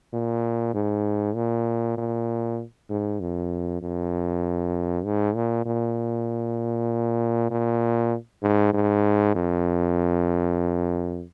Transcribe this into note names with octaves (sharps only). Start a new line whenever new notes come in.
A#2
G#2
A#2
A#2
G#2
F2
F2
G#2
A#2
A#2
A#2
G#2
G#2
F2